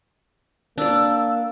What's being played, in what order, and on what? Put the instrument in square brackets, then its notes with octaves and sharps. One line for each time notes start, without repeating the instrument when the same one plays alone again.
[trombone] A#3 [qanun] D4 D5 [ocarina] E6